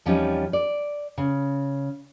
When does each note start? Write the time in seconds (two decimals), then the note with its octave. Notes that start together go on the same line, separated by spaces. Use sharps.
0.06 E2 F3 G3 C4 C#4 D#4
0.53 D5
1.18 C#3